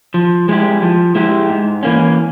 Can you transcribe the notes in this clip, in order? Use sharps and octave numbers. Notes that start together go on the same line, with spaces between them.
F3
G#3 E4 G4
F3
G#3 E4 G4
G#2
E3 A#3 C#4